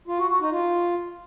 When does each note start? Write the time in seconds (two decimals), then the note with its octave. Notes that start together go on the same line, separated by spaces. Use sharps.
0.08 F4
0.19 F#4
0.29 F#4
0.40 D#4
0.51 F4